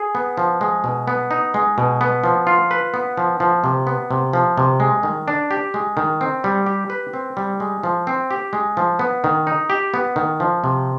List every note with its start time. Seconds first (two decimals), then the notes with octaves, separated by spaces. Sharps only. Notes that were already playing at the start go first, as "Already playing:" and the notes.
Already playing: G#4
0.15 B3
0.37 F3
0.61 G#3
0.84 B2
1.08 B3
1.31 D#4
1.54 G#3
1.78 B2
2.01 B3
2.24 F3
2.47 F4
2.71 B4
2.94 B3
3.17 F3
3.40 F3
3.64 C3
3.87 B3
4.11 C3
4.33 F3
4.58 C3
4.80 G#3
5.03 D#3
5.28 D4
5.51 G4
5.74 G#3
5.97 D#3
6.21 C4
6.44 G3
6.66 G4
6.90 B4
7.13 C4
7.37 G3
7.60 G#3
7.83 F3
8.07 C4
8.31 G4
8.53 G#3
8.77 F3
8.99 B3
9.24 D#3
9.47 D#4
9.70 G4
9.94 B3
10.16 D#3
10.40 F3
10.64 C3